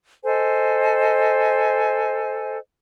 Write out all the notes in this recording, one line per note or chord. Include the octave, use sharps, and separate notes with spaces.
A4 C5 D#5 G#5